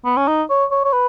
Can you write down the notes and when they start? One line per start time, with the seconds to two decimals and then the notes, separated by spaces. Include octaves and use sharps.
0.05 B3
0.17 C#4
0.28 D#4
0.50 C#5
0.71 C#5
0.85 C#5
0.93 B4